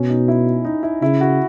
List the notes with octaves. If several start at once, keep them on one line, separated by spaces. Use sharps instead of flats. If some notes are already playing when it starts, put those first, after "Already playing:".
Already playing: B2 C#4
D#4
E4
D#4
E4
C#3 E4
F#4